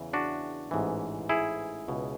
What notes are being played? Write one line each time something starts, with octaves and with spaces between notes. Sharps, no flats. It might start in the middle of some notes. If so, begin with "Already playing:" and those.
Already playing: E2 C#3 E3
D4 F#4
A1 G#2 E3
E4 G#4
C#2 B2